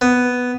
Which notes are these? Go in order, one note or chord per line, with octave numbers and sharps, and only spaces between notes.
B3